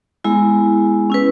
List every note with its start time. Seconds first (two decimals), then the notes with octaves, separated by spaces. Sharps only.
0.24 G#3 B3 E4 G#4
1.10 C#4 E4 B4